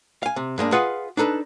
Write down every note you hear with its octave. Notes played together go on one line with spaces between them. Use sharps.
F5 G#5
C3
G2 G#3 A#3 D4
F4 G#4 B4 D#5 F5 F#5
D4 D#4 A4 B4